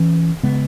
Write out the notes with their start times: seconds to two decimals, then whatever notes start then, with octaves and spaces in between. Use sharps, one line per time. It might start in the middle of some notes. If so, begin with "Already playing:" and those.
Already playing: E3 C#4
0.43 C#3 G#3 B3